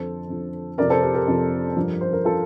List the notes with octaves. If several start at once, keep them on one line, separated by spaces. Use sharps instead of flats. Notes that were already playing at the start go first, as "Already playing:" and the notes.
Already playing: F2 D3 F3 A4 C5
F2 D3 F3
F2 C3 F3 A#4 D5
A4 C5
G4 A#4
G4 A#4
F2 C3 F3
G2 F3
C5
A#4
F3 F4 A4